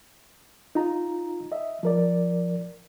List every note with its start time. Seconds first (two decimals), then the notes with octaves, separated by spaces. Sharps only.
0.75 D#4 F4 A#5
1.52 D#5 E5
1.83 F3 A#4 D5